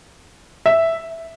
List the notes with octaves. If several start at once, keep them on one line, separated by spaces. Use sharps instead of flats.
E5